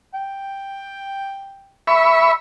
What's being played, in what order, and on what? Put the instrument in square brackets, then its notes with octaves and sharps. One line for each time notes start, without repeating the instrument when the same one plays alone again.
[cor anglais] G5
[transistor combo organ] E5 B5 C#6